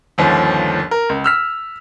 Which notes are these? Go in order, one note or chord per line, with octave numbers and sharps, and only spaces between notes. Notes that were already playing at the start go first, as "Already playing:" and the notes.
G1 D#2 F3 C#4
A#4
C#2
E6 F6 B6